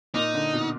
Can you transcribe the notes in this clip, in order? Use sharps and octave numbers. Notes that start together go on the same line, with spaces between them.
A#2 D#4
D3
B2